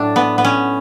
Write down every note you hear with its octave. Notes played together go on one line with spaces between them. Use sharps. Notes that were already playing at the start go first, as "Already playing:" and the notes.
Already playing: A2 F#3 A3 D4
B3
B3
C#4